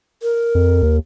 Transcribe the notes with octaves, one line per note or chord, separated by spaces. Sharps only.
A#4
F2
D#2